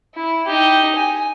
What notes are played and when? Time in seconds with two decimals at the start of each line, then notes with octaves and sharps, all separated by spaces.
0.15 E4
0.46 D#4 G4
0.96 G#5